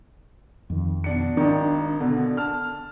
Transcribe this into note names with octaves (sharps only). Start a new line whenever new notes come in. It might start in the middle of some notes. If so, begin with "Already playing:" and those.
F2 D#3
B2 D4 C#7
G#1 D#3 D4
B2 D3
A5 F6